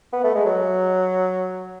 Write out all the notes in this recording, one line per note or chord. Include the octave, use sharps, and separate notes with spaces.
B3
A3
G#3
F#3